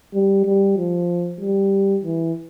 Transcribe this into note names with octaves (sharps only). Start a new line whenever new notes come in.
G3
G3
F3
G3
E3